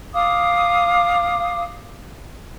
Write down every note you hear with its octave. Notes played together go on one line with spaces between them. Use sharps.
F5 D6 D#6